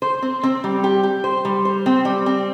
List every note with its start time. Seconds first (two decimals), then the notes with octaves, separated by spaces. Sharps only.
0.02 C5
0.22 C4
0.43 C4
0.64 G3
0.84 G4
1.03 G4
1.24 C5
1.45 G3
1.65 C5
1.86 C4
2.05 G3
2.26 C4